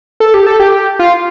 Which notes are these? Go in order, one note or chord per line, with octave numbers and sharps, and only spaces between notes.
A4
G4
A4
G4
F4